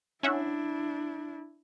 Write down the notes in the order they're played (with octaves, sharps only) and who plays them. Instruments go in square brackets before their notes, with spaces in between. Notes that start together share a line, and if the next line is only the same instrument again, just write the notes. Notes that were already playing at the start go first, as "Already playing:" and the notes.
[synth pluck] C#4 E5 F#5 [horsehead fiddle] D4 E4